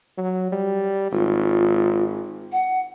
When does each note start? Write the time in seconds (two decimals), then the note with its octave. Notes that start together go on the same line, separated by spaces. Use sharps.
0.18 F#3
0.52 G3
1.12 G#1 F4
2.52 F#5